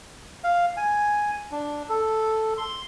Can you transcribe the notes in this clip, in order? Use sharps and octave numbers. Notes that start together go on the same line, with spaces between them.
F5
G#5
D4
A4
C6